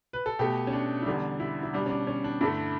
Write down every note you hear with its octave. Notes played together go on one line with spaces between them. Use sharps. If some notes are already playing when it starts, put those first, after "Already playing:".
B4
A4
B2 A3 G4
C#4
D4
E4
E2 D3 G3 D4
E4
E4
B2 G3 D4
C#4
D4
C#4
D4
G2 D3 A3 E4